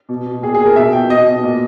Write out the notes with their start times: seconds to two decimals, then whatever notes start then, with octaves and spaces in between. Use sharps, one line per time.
0.09 B2
0.26 B2
0.42 A#2 G#4
0.54 A#2 G#4
0.65 A#4
0.76 B2 E5
0.93 B2 G5
1.09 B2 D#5
1.27 B2
1.43 A#2